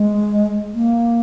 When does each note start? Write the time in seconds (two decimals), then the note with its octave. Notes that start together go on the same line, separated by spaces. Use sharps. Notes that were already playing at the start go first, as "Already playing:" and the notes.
Already playing: G#3
0.74 A#3